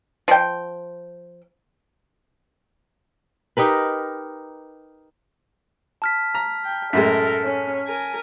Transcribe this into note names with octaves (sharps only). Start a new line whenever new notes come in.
F3 G5
D#4 G4 A#4 B4
A5 F6 B6
A#5
G5
F#2 A2 G#3 A4 A#4 B6
C#4
A#4 G#5